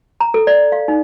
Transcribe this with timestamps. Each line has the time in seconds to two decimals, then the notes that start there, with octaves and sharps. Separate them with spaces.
0.20 A#5
0.34 A4
0.47 D5
0.72 F5
0.88 D#4